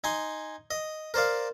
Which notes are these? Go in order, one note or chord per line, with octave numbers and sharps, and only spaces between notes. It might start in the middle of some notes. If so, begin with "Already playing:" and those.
D#4 G#5 C6
D#5
A#4 C5 D5 F5